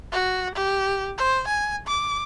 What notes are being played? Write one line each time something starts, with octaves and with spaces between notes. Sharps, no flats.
F#4
G4
C5
G#5
D6